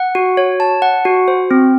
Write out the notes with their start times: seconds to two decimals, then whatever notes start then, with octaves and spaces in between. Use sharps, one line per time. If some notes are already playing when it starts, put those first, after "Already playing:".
Already playing: F#5
0.15 F#4
0.37 C#5
0.60 A5
0.82 F#5
1.05 F#4
1.28 C5
1.51 C4